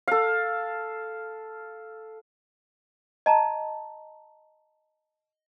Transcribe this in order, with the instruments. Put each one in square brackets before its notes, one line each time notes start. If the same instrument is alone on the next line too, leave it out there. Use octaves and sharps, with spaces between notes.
[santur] A4 F5
[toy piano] D#5 A5 A#5